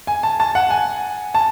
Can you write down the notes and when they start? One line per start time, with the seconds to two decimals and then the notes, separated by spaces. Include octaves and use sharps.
0.07 G#5
0.23 A5
0.40 A5
0.55 F#5
0.70 G#5
1.34 A5